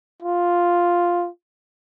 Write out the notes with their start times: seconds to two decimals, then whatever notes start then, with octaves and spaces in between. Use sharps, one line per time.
0.22 F4